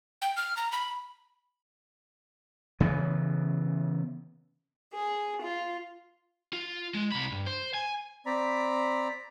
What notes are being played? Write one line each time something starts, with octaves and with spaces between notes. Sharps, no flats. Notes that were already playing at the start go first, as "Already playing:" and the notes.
G5
F6
A#5
B5
C#3 E3 B3
G#4
F4
F4
G#3
C2 B5
G2
C5
G#5
C4 D5 A#5 B5